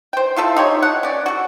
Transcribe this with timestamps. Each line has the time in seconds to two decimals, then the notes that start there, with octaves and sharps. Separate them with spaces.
0.13 C5 G5
0.36 E4 F4 A4 E5
0.56 D#4 G4 C#5
0.82 F#5
1.03 C#4 D5
1.26 F#4 A4